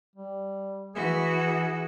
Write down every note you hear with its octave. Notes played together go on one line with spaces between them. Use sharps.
G3
E3 F#4 G#4